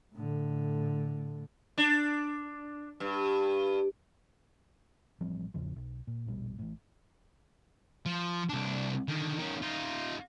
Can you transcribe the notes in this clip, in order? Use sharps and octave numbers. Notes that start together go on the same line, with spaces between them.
A2 D3
D4
G2
A1 F3 G3 C4
A1 E2 C#3 F3
B1
A#2
E1 A#1 B2 G3
A1 A2
F3
C2 D4
D3 D#3
D#3 C#4
D#4 F4